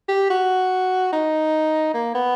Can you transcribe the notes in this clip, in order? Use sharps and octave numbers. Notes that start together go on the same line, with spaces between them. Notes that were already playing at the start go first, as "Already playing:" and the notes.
G4
F#4
D#4
A#3
B3